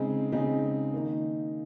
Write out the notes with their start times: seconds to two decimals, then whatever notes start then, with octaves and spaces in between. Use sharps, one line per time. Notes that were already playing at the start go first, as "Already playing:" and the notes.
Already playing: C#3 G#3 C4 D#4
0.32 C#3 G#3 C4 D#4
0.93 D#3 A#3 D#4